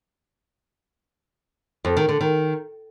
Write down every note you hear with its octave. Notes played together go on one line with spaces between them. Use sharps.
F2
D#3
D3
D#3